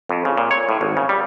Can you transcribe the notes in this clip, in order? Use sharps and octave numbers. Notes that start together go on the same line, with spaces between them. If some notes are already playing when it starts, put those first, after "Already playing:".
F2
C#3
A#2
C#5
A2
G#1
C#3
G3